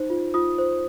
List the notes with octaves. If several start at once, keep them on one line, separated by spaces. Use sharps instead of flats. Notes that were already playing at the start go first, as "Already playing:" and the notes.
Already playing: D#4 C5
F4
F4 D#6
C5